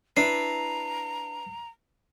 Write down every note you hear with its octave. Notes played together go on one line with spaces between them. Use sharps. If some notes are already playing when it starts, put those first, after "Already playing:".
D4 E4 B4 A#5 C7